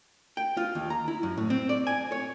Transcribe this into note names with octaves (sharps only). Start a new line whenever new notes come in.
G5
F4
D#2
A#5
E4
F#2
A2
C4
D5
G#5
C#5